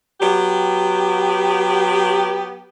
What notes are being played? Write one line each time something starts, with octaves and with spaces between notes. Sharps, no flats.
F#3 B3 G4